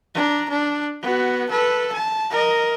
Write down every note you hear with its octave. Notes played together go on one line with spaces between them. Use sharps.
D4 A#5
D4
B3 F#4
A4 B4
A5
A#4 D#5